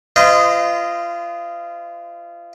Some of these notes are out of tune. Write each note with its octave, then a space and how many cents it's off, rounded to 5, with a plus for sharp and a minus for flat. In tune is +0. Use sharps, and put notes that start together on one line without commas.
F4 -25 C5 -35 D#5 -5